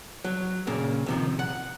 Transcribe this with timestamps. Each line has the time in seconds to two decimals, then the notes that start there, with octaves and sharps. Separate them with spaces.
0.25 F#3
0.67 A#2 C#3 A#3
1.06 C3 D#3 F3
1.39 F#5